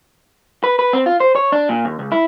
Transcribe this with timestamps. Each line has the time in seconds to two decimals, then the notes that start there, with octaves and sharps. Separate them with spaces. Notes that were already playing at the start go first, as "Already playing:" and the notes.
0.64 B4
0.79 B4
0.93 C4
1.06 F4
1.20 C5
1.35 C#5
1.52 D4
1.69 A#2
1.85 D#2
1.99 C#2
2.12 E4